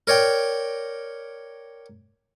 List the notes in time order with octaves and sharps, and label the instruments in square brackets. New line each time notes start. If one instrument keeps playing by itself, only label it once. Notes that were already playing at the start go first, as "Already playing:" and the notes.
[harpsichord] A#4 C#5 D5 G5